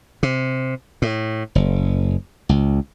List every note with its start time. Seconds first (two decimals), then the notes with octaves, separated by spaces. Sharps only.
0.23 C3
1.02 A2
1.55 F#1
2.49 C#2